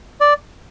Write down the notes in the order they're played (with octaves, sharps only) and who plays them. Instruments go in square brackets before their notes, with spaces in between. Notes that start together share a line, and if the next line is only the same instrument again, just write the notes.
[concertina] D5